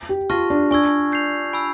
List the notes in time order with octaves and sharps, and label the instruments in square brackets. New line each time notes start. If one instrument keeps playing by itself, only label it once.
[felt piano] G4
[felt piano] F4 [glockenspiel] A5 C#6 F6 A#6
[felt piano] D4
[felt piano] D4 [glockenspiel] G#5 C#6 E6 G#6
[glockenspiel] G6 C7 F7
G#5 B5 E6